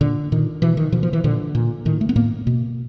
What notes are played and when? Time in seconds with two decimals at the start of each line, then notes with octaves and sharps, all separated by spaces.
0.01 A#2 D3
0.32 A#2 D#3
0.62 B2 E3
0.77 D#3
0.92 B2 F3
1.03 F3
1.13 E3
1.24 A#2 D3
1.55 A#2
1.85 A2 D#3
2.01 A3
2.09 B3
2.16 A2 A#3
2.47 B2